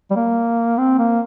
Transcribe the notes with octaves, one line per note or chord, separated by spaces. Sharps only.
G3
A#3
C4
A#3